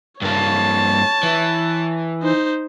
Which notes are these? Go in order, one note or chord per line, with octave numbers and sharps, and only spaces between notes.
G2 A#3 C#5 A5
E3
D#4 C5